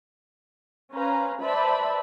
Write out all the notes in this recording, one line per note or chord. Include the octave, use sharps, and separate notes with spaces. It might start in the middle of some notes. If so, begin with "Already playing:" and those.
C#4 B4 C5 F5 A#5
B4 C5 D5 E5 A5 B5